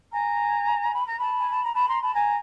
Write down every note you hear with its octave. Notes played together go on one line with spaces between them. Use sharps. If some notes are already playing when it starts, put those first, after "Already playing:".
G#5 A#5
B5
A#5
A5 B5
G#5
A5
A#5
A5 B5
A#5 C6
A5 B5
G#5 A#5